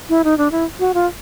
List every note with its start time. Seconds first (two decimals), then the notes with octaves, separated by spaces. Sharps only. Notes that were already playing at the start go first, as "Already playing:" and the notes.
0.09 E4
0.24 D#4
0.38 D4
0.52 E4
0.79 F#4
0.94 F4